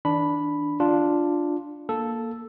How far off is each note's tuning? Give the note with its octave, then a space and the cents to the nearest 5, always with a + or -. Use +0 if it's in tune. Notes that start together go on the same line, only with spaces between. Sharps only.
E3 -45 D4 -5 B5 +0
D4 +0 F4 +0
A#3 +0 A4 +0